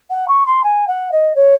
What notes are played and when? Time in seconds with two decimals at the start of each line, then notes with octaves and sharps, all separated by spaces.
0.10 F#5
0.28 C#6
0.46 C6
0.63 G#5
0.87 F#5
1.11 D#5
1.35 C#5